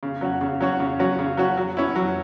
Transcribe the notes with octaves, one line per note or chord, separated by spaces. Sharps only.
C#3
F#3 C#4 F#4
C#3
F#3 C#4 F#4
C#3
F#3 C#4 F#4
C#3
F#3 C#4 F#4
F#3
C#4 E4
F#3